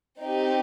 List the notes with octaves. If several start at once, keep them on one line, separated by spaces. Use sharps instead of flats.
C4 D#4 G4